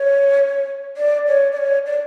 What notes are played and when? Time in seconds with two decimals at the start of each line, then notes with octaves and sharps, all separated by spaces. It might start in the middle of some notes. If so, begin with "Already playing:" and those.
Already playing: C#5
0.97 D5
1.28 C#5
1.52 D5
1.57 C#5
1.86 D5